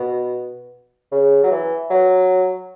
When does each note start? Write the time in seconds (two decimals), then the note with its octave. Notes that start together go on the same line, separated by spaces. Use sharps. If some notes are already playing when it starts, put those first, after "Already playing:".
Already playing: B2
1.11 C#3
1.43 F#3
1.51 E3
1.90 F#3